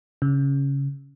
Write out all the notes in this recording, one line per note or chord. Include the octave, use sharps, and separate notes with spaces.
C#3